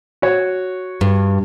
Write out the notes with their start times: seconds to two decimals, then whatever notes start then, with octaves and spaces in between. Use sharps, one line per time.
0.22 F#4 C#5
1.01 G2